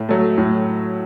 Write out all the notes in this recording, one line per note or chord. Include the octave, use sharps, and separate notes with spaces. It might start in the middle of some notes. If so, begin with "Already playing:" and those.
Already playing: A2
F#3 A3
A2